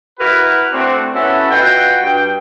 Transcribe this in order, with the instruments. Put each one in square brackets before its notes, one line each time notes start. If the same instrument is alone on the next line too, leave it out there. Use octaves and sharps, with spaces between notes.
[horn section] E4 F#4 A#4 B4
A3 C4 D4 E4 F#4
B3 C#4 E4 F#4 A4 C#5
F4 F#4 B4 D#5 F#5 G5
G2 G5